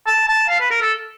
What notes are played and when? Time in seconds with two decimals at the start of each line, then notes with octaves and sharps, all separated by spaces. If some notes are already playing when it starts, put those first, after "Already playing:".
0.07 A5
0.28 A5
0.49 F5
0.60 B4
0.71 A#4
0.81 A4